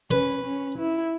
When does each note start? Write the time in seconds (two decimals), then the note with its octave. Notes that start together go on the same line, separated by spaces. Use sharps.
0.11 C#4 B4
0.44 C#4
0.78 E4